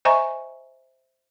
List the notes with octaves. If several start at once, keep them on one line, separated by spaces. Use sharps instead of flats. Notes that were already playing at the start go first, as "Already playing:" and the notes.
C5 D#5 E5 G#5 A#5 C#6